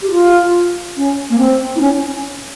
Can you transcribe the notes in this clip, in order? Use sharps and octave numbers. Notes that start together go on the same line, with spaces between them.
G4
F4
C#4
A#3
C4
E4
C#4